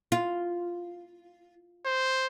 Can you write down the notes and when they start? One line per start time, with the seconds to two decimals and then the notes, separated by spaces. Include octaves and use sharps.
0.12 F4
1.86 C5